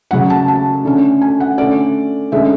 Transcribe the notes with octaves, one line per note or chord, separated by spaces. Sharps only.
C#3 F#3 C#4 F#5
A5
A5
D3 A3 C#4
G#5
F#5
D3 A3 C#4 D5
D3 G#3 C#4 E5